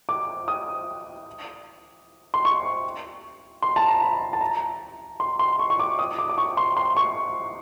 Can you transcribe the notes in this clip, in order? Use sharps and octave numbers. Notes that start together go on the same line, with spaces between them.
D6
D#6
C6
C#6
C6
A5
A#5
B5
A5
A#5
C6
C6
C#6
C#6
D6
D#6
D6
D6
C#6
C6
C6
C#6